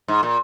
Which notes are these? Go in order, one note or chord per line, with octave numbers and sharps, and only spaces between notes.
G#2
A#2